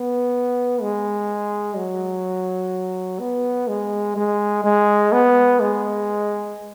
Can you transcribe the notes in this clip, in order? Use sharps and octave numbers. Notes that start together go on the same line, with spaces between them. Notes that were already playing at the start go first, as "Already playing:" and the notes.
Already playing: B3
G#3
F#3
B3
G#3
G#3
G#3
B3
G#3